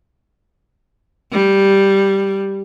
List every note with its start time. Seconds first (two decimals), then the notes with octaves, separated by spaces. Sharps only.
1.32 G3